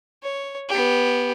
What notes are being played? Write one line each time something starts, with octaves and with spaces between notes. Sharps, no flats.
C#5
B3 G4